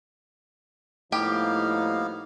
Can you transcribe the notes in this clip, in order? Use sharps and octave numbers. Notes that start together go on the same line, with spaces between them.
A2 F3 G3 A#3 B3 D#4 G4 F5